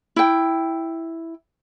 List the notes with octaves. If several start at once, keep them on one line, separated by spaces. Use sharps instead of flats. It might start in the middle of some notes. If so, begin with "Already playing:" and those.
E4 G5